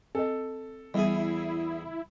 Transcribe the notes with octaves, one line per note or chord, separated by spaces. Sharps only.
C4 A4 D#5
E2 G3 E4 G#4 E5